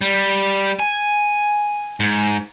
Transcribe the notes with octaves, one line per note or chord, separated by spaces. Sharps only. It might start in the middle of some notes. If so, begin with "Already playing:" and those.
G3
G#5
G#2